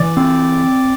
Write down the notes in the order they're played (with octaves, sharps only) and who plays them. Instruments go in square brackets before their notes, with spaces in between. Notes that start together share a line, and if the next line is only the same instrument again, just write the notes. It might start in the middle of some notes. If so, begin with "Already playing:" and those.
Already playing: [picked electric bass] E3 [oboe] D5
[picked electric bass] C4